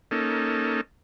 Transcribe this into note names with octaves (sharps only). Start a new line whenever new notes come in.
A#3 C#4 D#4 A4